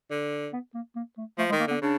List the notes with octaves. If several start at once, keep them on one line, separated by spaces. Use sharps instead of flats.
D3
B3
A#3
A#3
A3
F3 A3
G#3
D#3
A#3
D3 B3
C#3 D4